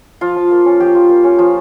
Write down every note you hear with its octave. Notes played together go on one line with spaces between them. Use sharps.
F3 F4
F3
A#3
C#4
F3 G4
F3
A#3
C#4
F3